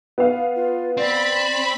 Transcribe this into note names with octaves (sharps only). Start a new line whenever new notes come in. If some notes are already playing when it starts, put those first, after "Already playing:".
B3 F5
F4
C4 D5 B5